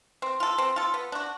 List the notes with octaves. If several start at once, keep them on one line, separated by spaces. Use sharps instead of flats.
C4
F4 A4
C4
F4 A4
B3
D4 F#4